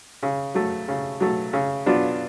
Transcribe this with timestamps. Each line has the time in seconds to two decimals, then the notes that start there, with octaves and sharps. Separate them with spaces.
0.23 C#3
0.54 F#3 A3
0.88 C#3
1.20 F#3 A3
1.53 C#3
1.86 F#3 B3 D4 F4